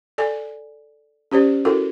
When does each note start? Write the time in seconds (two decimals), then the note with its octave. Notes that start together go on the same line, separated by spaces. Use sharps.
0.18 A4 D5 G#5
1.32 C#4 G4 C5 D5
1.65 E4 F#4 A4 A#4